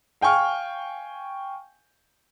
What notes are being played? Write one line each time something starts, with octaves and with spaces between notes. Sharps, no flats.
F5 G5 G#5 C#6 F6